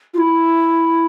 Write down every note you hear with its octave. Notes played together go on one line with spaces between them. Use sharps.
F4
E4